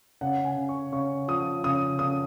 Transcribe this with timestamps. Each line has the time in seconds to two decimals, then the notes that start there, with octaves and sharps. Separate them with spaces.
0.21 C#3 F#5
0.45 G#5
0.56 C#3
0.69 C#6
0.92 C#3 C#6
1.28 F3 D#6
1.64 C#3 D#6
1.99 C#3 D#6